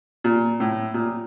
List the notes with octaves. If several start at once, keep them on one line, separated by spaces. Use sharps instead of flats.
A#2
A2
A#2